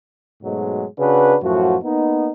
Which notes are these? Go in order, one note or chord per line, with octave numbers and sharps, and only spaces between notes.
G#2 B2 F#3 G#3 A3
C#3 D4 F#4 B4
F#2 A2 F3 F#4
A#3 B3 D#4